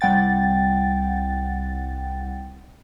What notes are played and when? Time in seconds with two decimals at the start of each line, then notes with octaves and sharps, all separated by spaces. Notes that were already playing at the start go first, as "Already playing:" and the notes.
0.01 C2 G3 F#5 G5 A6